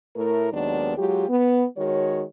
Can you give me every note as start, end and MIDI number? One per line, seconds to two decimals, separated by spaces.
0.16 0.51 45
0.16 0.51 57
0.16 0.51 64
0.16 0.51 70
0.52 0.97 39
0.52 0.97 51
0.52 0.97 54
0.52 0.97 56
0.52 0.97 59
0.52 0.97 62
0.98 1.29 54
0.98 1.29 56
0.98 1.29 65
0.98 1.29 67
1.29 1.65 59
1.77 2.23 51
1.77 2.23 56
1.77 2.23 66
1.77 2.23 73